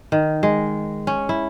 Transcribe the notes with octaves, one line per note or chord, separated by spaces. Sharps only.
D#3
G#3
C#4
E4